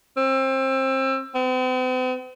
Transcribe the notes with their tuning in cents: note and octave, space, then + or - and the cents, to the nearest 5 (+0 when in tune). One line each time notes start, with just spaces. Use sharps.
C4 +25
C4 -45